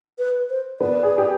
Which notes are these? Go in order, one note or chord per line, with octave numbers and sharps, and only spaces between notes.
B4
C5
B3 B4 D5
G#4
G4